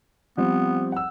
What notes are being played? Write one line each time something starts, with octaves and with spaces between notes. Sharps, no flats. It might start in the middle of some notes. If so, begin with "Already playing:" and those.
F3 G3 B3 C4
F#5 E6